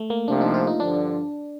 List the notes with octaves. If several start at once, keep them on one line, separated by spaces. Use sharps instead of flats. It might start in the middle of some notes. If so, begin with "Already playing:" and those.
Already playing: A3
A#3
C2 C3 F3 D4
D#4
F4
D#4
G2 D3 F3 D4